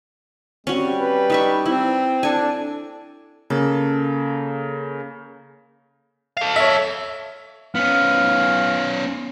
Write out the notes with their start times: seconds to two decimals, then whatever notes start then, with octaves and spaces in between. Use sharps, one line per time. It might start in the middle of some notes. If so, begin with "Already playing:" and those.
0.67 G3 C4 C#4 F#4
0.98 B4
1.30 D#4 E5 C#6
1.66 C4 E4
2.23 D4 A4 G#5
3.50 C#3 A#3 A4
6.37 A4 F5
6.56 C#5 E5
7.75 B3 C#4 F5